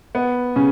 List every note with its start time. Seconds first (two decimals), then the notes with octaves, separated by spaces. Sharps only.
0.15 B3
0.56 C#3 C#4